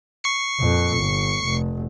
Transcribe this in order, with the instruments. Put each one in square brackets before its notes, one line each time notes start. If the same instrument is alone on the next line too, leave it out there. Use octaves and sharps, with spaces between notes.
[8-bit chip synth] C#6 C7 C#7
[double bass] F2 A#2
G1
F1